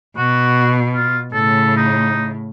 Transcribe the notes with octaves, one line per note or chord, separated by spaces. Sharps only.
B2 F#4
F4
A2 C#3 A4
D#4